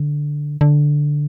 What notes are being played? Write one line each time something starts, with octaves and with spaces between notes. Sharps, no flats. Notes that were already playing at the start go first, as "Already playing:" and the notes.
Already playing: D3
D3